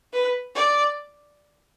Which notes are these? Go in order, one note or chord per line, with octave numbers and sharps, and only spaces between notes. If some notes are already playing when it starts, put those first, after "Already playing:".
B4
D5